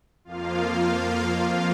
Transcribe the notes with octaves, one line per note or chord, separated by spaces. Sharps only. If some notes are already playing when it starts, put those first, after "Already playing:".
F2 F3 A#3 F4 F5